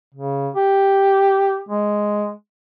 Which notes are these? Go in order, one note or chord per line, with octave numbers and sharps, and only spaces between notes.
C#3
G4
G#3